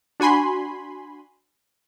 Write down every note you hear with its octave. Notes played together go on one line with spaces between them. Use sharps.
D4 F#4 G#5 B5 C6